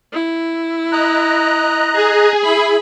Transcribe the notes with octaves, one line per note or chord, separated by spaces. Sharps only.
E4
D#5 A#5 F#6
G#4
E4 B5